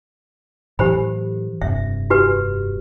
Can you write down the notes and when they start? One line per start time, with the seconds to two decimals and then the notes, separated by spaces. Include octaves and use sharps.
0.79 A2 E3 F#3 G4 C5 B5
1.62 F1 G2 C3 E5
2.10 F#4 G4 B4